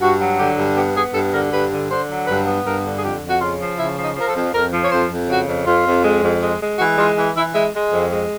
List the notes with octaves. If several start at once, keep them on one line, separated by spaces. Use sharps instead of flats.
G2 F#4
F#3
D3 G4
G2
B3 G4
B3 G#4
G2 A4
D3 A#4
G2 B4
D3
D3 C5
F#3
G2 B4
B3
G2 A#4
D3
G#4
F2 G4
F2
F#4
C#3 F4
F3
C#3 E4
F3
D#4
F3 A#4
A4
F2
F2 A#4
F3
C#5
F2 C5
F2
C#3 F#4
F2
F2 F4
F2
G#3
F2
G#3
G#3
E3 F#4
G#3 F4
E3
E3 E4
G#3 E4
G#3
F2
G#3